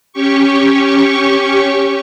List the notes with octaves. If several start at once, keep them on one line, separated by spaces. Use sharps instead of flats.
C#4 G4 C#6